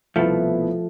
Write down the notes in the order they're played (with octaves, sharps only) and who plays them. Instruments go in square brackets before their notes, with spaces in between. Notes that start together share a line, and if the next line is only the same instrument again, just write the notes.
[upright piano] C2 B2 B3 E4 B4 [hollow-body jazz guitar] F3 A3